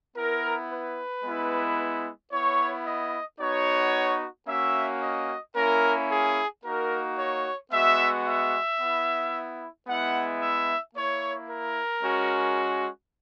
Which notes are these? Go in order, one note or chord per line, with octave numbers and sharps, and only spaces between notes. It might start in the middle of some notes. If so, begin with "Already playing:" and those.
B3 E4 A#4
B4
G#3 B3 E4
B3 E4 C#5
D#5
B3 D#4 F#4 C#5
A#3 C#4 F#4 E5
D#5
A#3 C#4 E4 A#4
G#4
A#3 D#4 F#4 A#4
C#5
G#3 B3 F#4 E5
E5
B3 E4
G#3 B3 E4 F#5
E5
A#3 E4 C#5
A#4
G#3 C#4 F#4